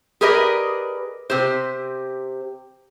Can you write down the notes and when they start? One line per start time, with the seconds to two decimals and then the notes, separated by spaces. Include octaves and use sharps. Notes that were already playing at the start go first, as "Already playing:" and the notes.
0.21 G4 G#4 A#4 B4 D5 D#5
1.30 C3 G4 C5